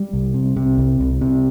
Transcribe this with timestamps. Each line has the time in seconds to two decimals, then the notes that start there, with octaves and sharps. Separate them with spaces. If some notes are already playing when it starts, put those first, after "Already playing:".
Already playing: G3
0.13 C2
0.34 C3
0.57 C3
0.78 C2
1.00 C2
1.21 C3